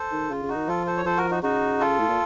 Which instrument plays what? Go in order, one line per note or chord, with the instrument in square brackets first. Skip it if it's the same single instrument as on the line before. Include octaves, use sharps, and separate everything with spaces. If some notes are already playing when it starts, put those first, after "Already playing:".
Already playing: [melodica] A4 C5
[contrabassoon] D#3
[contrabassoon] C#3 [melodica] F4
[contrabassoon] C#3
[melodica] D#4 F#4
[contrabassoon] D#3
[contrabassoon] F3 [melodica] F4 A4
[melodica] A4 C5
C#5
[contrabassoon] F3 [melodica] A4 C5
[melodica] F#4 A#4
D#4 F#4
[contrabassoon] C#3 [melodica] D#4 F#4
[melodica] F4 A4
[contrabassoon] A2
A#2